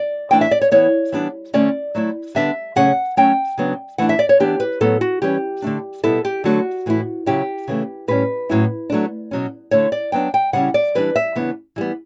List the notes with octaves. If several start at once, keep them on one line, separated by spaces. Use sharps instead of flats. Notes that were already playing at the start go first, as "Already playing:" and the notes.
Already playing: D5
E3 A3 D4 G5
E5
D5
C#5
E3 B3 E4 C#5
E3 G3 B3 D4
D3 A3 C#4 D5
F#3 A3 E4
D3 G3 B3 D4 E5
C#3 F#3 A3 C#4 F#5
F#3 A3 C#4 G5
C#3 F#3 B3 D4
E3 A3 D4 F#5
E5
D5
C#5
E3 B3 D4 G4
B4
A2 F#3 B3 A4
F#4
E3 G3 C#4 G4
D3 A3 D4
B2 G3 B3 E4 A4
G4
D3 F#3 A3 D4 F#4
A2 E3 A3 E4
C#3 F#3 C#4 E4 G4
C#3 E3 A3
A2 G3 C#4 B4
A2 F#3 C#4 E4
F#3 A3 D4
B2 F#3 C#4
D3 A3 E4 C#5
D5
D3 F#3 B3 D4 G5
G5
C#3 G3 C#4 E4 F#5
D5
E3 G3 D4 B4
E5
C#3 E3 B3 D4
E3 G3 B3